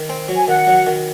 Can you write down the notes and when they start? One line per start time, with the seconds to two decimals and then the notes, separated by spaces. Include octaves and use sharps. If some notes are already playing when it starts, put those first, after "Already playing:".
Already playing: D#3
0.09 C4
0.28 F#3
0.36 G#5
0.48 D#3 F#5
0.67 F#3
0.87 D#3